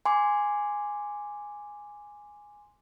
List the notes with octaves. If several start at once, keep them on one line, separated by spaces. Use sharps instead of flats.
G#5 C6 D6